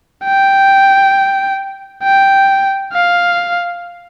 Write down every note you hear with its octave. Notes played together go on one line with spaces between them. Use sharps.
G5
G5
F5